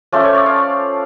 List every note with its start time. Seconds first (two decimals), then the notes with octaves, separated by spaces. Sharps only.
0.12 F3 A3 C#4 D5
0.23 C#5
0.35 D5
0.46 F5